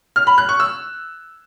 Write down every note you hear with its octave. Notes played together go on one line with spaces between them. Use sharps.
F6
B5
F#6
C#6
E6